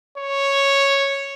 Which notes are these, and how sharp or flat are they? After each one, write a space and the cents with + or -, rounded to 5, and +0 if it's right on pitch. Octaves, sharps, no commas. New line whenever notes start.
C#5 -5